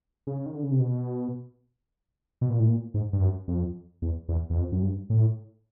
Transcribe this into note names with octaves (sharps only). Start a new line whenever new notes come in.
C#3
D#3
D3
C#3
C3
B2
B2
A#2
A2
A#2
G#2
G2
F#2
F2
E2
E2
E2
F2
F#2
G2
A2